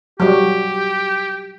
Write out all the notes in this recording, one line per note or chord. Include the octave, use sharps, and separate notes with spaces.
F#3 G3 G4